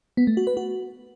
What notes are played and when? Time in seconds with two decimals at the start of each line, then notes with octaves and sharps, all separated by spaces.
0.17 B3
0.27 A3
0.37 F#4
0.47 B4
0.57 F#4